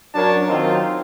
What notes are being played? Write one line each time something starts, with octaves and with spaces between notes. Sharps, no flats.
F#2 F#3 D4 A#4 C#5 A5
D#3 F#3 C4 D#4 F4